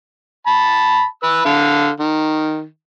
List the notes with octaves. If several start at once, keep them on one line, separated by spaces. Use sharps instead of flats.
A5 B5
B4 E6
D3 F5
D#3